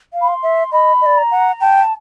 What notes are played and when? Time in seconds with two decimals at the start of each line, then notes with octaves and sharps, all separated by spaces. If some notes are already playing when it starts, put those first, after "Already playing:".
0.13 F5
0.21 B5
0.28 C6
0.43 E5
0.72 D#5 B5
1.01 D#5
1.06 D5
1.17 A#5
1.31 F#5
1.61 G5 A5